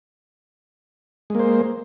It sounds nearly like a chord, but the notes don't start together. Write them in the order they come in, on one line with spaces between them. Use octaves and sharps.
G#3 A#3 C5